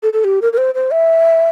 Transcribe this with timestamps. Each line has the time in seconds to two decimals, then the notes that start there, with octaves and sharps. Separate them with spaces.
0.03 A4
0.13 A4
0.24 G4
0.42 A#4
0.53 A#4
0.57 C5
0.74 C5
0.91 E5